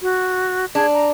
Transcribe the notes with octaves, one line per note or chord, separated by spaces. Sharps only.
F#4
D4 G#4
A#5